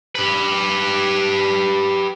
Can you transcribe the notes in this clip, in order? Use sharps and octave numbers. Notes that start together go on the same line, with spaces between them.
G4 B4